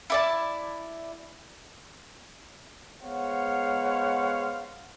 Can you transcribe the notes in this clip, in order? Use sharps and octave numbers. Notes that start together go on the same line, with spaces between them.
E4 D5 A5
G#3 B3 C5 C#5 F5 F#5